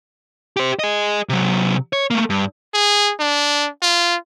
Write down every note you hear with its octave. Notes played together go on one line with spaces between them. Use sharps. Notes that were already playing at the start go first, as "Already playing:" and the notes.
G4 C5
G#4 D#5
C3 F#3
C#5
A3 A#3
G2
G#4
D4
F4